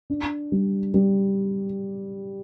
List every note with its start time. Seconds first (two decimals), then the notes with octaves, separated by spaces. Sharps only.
0.10 D4
0.52 G3
0.94 G3